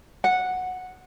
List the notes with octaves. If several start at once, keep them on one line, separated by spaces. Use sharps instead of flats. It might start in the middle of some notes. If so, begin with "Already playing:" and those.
F#5